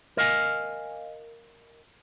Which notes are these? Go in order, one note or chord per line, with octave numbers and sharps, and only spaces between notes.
A#4 D#5 F5 G#5